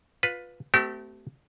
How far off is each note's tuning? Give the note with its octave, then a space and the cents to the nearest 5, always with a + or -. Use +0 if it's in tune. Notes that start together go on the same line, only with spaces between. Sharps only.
F4 +15 B4 +0
A3 +0 C4 -40 G4 -40